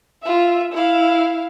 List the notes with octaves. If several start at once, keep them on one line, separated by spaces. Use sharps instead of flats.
F4 E5
E4 F5